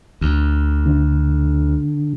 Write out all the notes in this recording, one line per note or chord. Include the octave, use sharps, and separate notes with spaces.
D2
D3